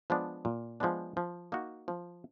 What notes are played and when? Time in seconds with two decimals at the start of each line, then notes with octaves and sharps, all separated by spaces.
0.10 F3 G#3 B3 D4
0.45 A#2
0.80 F3 G#3 B3 D4
1.17 F3
1.52 A#3 D#4 F#4
1.88 F3